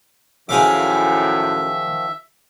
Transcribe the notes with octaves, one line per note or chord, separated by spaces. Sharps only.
F#2 A2 D#3 F3 G#4 E5 F5 D6